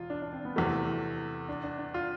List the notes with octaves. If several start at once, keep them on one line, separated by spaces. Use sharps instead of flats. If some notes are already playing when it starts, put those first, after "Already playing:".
Already playing: E1 F4
D4
D4
C4
B3
E2 C3 E3 A3
D4
D4
D4
F4